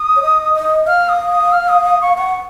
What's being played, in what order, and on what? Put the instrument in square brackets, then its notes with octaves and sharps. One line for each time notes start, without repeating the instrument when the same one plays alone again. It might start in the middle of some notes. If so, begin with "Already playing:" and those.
Already playing: [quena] D#6
[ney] C#5
D#5
D#5
[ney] F5 [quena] F6
[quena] D#6
D#6
F6
D#6
D#6
C#6
[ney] F#5 [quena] C#6